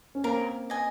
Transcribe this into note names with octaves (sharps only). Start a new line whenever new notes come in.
C#4
A#3 C4 A#4
D#5 G#5